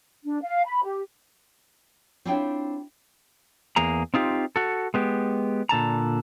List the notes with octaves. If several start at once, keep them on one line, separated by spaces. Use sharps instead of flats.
D4
F5
B5
G4
C4 D4 E4 F4 C#5 G5
E2 A#3 G#4 A#5
C4 D#4 F4 G4
F#4 A4
G#3 B3 G4
A#2 D3 A5 A#5